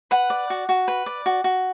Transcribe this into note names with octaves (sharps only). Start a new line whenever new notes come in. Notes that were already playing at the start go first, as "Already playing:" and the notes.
B4 F#5
D5
F#4
F#4
B4
D5
F#4
F#4